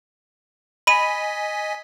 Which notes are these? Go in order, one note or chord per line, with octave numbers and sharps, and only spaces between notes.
D#5 G#5 B5 B6 D#7